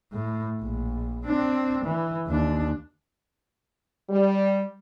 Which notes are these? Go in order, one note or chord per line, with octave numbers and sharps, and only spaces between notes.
A2
A#1
C4 D4
E3
D#2 D4
G3